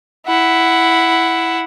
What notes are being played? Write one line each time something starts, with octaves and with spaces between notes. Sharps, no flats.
E4 F#5